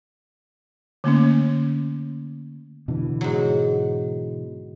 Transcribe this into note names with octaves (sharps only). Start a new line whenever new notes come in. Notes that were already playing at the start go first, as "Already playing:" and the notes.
D3 A3 A#3 C#4
B2 D3 E3
G#2 F#3